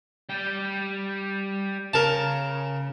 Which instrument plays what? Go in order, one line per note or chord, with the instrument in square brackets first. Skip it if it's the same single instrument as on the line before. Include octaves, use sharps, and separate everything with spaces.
[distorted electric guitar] G3 G5
[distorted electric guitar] C#3 [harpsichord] A#4 A5